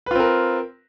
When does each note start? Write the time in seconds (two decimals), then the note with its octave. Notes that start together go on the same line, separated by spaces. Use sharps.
0.06 B4
0.11 F4
0.15 C4
0.20 A#4